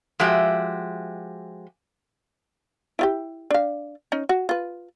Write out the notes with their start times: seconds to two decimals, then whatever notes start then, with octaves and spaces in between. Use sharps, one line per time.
0.20 F3 G#3 F#4 G4 E5
2.99 E4 F4 G4
3.51 D4 F5
4.12 C#4 D#4
4.29 F#4
4.49 F4 B4